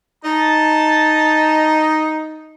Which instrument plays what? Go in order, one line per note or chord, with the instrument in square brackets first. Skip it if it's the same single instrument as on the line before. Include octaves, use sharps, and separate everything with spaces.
[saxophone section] D#4 [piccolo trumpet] A5